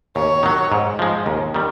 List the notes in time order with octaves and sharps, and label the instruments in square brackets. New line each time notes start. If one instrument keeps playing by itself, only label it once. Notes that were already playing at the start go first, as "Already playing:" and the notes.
[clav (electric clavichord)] D#2 [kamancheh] C#5
[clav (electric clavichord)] D#3 F#3
G#2
F3 G#3
D#2
D#3 G3